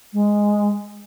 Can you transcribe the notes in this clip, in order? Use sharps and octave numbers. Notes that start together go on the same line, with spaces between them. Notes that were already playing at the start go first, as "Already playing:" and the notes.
G#3